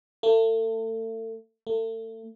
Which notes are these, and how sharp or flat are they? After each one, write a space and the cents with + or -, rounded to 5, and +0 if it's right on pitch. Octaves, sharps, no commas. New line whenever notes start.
A3 +35
A3 +35